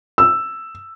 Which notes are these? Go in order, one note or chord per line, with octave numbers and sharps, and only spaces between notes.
E6